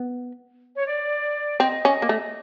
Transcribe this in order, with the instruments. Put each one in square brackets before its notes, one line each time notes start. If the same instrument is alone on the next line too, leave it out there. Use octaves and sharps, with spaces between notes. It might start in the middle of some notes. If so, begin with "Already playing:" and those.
Already playing: [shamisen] B3
[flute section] C#5
D5
[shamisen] C4 [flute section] D#5
[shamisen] C#4
A#3
A3